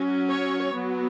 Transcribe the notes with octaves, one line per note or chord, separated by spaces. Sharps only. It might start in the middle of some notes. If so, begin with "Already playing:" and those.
Already playing: F#3 C#4
C#5
F#3 B3